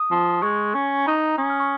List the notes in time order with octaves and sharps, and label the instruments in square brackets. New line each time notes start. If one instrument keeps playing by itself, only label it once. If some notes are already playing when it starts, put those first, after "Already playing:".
Already playing: [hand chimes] D#6
[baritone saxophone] F3
[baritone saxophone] G#3 [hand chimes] C#6
[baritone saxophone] C#4
[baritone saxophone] D#4 [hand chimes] A#5
[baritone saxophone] C#4 [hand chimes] D#6
[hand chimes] F6
C#6